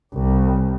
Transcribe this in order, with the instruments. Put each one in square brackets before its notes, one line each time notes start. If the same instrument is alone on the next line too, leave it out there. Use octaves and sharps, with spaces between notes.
[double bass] C2